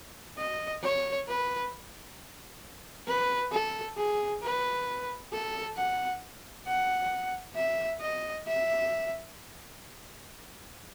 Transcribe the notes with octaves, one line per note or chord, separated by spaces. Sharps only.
D#5
C#5
B4
B4
A4
G#4
B4
A4
F#5
F#5
E5
D#5
E5